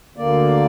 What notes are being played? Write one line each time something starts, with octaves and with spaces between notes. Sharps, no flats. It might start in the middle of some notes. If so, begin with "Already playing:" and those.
D2 D3 A#3 D5